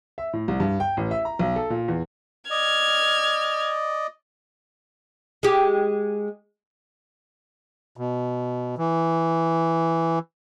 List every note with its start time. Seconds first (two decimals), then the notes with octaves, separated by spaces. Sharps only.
0.18 E5
0.33 A2
0.48 C2
0.60 G2
0.80 G5
0.97 A1
1.11 E5
1.25 A#5
1.39 B1
1.56 A4
1.70 A#2
1.88 E2
2.50 D5 D#5 F6 G#6
5.43 G#3 G4
7.97 B2
8.78 E3